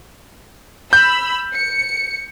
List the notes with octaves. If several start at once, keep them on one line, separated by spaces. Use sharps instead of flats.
B5 E6 G6
C#7